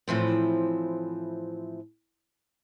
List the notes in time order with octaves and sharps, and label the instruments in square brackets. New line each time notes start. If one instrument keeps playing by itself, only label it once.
[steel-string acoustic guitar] A2 E3 F3 C4